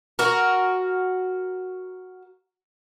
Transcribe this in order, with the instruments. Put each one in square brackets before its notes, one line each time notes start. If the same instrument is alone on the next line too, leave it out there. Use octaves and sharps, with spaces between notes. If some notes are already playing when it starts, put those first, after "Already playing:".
[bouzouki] F#4 A#4